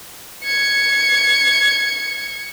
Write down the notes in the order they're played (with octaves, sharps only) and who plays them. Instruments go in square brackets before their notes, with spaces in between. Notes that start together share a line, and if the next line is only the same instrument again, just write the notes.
[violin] G#6 C#7